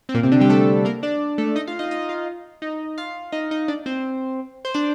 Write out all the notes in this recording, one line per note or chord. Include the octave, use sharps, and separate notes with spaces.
C4
A#2 A#3
C3 C4
D3 D4
G3 G4
A3 A4
A#3 A#4
D4 D5
A3 A4
D#4 D#5
F4 F5
D#4 D#5
D#4 D#5
F4 F5
D#4 D#5
F4 F5
D#4 D#5
D#4 D#5
D4 D5
C4 C5
C5
D4 D5